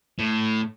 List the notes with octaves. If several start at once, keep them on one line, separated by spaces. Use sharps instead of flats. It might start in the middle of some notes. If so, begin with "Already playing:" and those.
A2